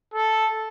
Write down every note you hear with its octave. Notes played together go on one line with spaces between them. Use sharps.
A4